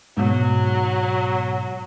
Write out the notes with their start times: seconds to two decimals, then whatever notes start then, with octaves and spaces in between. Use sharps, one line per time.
0.17 G#2 B2 F#3